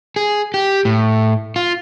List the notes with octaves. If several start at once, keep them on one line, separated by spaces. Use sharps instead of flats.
G#4
G4
A2
F4